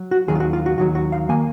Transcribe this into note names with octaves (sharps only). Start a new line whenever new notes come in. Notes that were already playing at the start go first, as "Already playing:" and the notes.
Already playing: F#3
F#4
D#2 D#3 F#3 G#4
F4
F#4
F4
F#4
D#2 D#3 F#3 F#4
F#4
F5
D#3 A#3 G#5